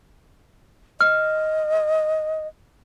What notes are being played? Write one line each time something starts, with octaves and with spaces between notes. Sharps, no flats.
D#5 F6